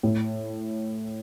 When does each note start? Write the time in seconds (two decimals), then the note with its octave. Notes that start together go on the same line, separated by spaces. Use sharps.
0.03 A2